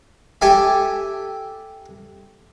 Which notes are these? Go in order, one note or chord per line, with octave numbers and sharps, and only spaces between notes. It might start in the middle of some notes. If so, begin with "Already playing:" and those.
G4 A4 E5 G#5